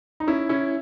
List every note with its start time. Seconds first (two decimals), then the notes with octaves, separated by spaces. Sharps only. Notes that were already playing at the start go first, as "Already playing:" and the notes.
0.20 D#4
0.27 C#4 E4
0.49 C#4 E4